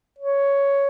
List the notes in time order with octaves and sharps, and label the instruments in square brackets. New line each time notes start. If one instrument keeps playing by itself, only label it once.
[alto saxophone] C#5